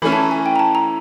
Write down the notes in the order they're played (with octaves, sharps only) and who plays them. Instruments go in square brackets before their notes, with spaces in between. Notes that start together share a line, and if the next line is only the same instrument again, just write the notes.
[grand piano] E3 A3 C#4 E4 [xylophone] B5
[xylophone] A5
A#5
G#5
G5
A#5
A5
A#5